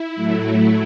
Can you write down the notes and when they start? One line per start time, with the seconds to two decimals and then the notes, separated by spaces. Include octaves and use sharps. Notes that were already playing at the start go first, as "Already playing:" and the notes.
Already playing: E4
0.15 A2 F#3 A3